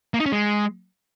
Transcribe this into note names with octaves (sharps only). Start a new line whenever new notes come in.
A#3
D#4
C#4
G#3